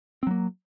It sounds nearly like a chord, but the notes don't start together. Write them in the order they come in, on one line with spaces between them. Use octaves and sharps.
C4 F#3 A#3